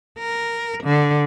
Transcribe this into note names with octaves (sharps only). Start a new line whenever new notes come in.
A#4
D3